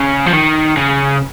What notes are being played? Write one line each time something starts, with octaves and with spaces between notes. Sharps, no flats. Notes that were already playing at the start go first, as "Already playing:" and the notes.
Already playing: C#3
F3
D#3
C#3